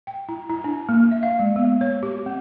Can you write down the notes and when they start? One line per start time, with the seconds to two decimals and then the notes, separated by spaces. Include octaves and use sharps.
0.07 G5
0.29 E4
0.50 E4
0.64 D4
0.89 A#3
1.11 E5
1.23 F5
1.39 G#3
1.56 B3
1.81 C#5
2.03 G4
2.26 C4